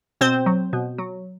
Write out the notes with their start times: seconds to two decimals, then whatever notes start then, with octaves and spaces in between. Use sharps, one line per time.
0.21 B2 C4 C5
0.46 F#3
0.73 B2
0.98 F#3